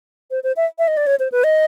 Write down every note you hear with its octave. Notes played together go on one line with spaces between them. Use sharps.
C5
C5
E5
E5
D#5
D5
C#5
C5
B4
D#5